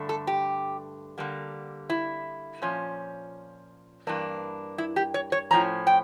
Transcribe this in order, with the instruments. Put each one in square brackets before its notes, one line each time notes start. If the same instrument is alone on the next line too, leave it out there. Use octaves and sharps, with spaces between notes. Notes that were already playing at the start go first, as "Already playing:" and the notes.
Already playing: [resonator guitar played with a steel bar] G2 D3 A3
A4
G4
D3 G3 A#3
E4
A#2 F3 C#4
G2 E3 A#3 D4
E4
G4
C#5
C#5
A2 F3 C#4 A#5
G5